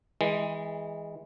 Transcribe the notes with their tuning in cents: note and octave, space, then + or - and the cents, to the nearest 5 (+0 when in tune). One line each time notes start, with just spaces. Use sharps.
E3 -25 G#3 -10